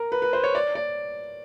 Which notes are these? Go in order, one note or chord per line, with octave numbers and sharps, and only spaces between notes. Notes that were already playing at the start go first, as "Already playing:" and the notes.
Already playing: A#4
B4
B4
C5
C#5
D5
D5